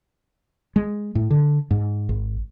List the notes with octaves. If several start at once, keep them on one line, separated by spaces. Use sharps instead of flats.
G#3
A2
D3
G#2
G#1